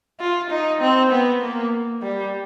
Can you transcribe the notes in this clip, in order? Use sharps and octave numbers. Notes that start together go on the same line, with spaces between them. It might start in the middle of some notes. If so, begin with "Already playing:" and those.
F4
D#4
C4
B3
A#3
G3